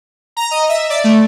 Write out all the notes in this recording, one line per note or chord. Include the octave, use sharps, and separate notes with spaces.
A#5
D#5
E5
D5
A3